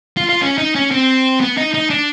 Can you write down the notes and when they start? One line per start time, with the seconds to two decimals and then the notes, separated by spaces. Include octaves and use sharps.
0.17 F4
0.29 F4
0.41 C#4
0.58 D#4
0.75 C#4
0.91 C4
1.41 B3
1.57 D#4
1.74 D#4
1.90 D4